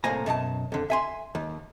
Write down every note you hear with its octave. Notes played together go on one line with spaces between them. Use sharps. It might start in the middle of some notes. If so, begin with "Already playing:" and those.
C2 A2 A#3 C5 G#5 A#5
F#2 B2 D5 A5
F2 D3
E5 G#5 C6
D#2